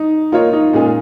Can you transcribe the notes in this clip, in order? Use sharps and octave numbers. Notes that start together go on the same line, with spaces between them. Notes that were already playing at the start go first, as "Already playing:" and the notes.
Already playing: D#4
A#3 D#4 F4 A#4 C#5
D#4
A#2 G#3 C#4 G#4